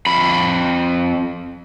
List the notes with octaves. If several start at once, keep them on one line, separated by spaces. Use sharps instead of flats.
F2 B5